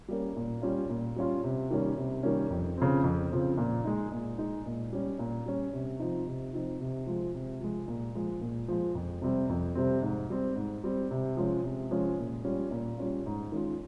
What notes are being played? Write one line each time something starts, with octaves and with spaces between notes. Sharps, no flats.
G3 A#3 C#4
A#2
G3 C#4 F4
A#2
G3 C#4 F4
C3
D#3 G3 A#3 C#4
C3
D#3 G3 A#3 C#4
F2
C#3 F3 C4
F2
C#3 F3 C4
A#2
G#3 D#4
A#2
G#3 D#4
A#2
G3 C#4
A#2
G3 C#4
C3
F3 C4 D#4
C3
F3 C4 D#4
C3
F3 G#3
C3
F3 G#3
A#2
F3 G#3
A#2
F3 G#3
F2
C3 G3 C4
F2
C3 G3 C4
G#2
G3 C4
G#2
G3 C4
C3
F3 G#3 C#4
C3
F3 G#3 C#4
A#2
G3 C#4 F4
A#2
G3 C#4 F4
G#2
D#3 G#3 C#4 F4